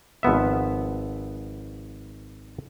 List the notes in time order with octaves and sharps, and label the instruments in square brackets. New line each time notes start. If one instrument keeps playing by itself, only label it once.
[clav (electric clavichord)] G#1 F3 B3 E5